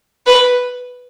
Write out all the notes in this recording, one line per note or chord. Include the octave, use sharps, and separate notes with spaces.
B4